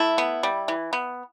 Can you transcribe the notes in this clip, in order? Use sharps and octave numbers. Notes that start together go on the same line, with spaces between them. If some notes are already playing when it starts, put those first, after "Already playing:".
Already playing: A3 E4
B3
G3
E3
B3